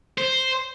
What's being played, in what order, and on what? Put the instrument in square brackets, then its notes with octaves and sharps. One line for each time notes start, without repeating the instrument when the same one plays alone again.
[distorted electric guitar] C5